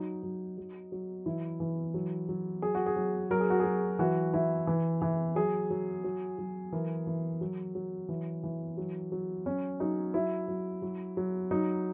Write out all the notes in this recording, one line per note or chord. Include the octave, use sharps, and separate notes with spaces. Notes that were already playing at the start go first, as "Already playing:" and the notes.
Already playing: F#3 D#4
F#3
F#3
F#3
E3 E4
E3
F#3
F#3
F#3 G#4
F#4
G#4
F#3
F#3 A#4
G#4
F#4
G#4
F#3
E3 F#4
E3 E4
E3
E3
F#3 G#4
F#3
F#3
F#3
E3 A#4
E3
F#3
F#3
E3
E3
F#3
F#3
F#3 C#4
F#3 D#4
F#3 E4
F#3
F#3
F#3
F#3 D#4